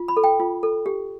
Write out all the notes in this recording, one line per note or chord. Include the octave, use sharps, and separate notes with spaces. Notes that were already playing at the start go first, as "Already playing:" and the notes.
Already playing: F4
B5
A4
G5
F4
A4
G4